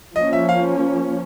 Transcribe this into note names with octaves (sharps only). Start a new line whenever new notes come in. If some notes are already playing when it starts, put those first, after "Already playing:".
F3 A#3 C#4 D#5
E5
F5